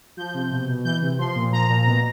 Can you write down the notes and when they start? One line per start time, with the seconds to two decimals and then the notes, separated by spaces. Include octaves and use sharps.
0.17 F3 G6
0.34 C3
0.51 B2
0.68 B2
0.84 E3 G6
1.02 C3
1.18 F3 C6
1.35 A#2
1.52 F3 A#5
1.69 A#2
1.86 B2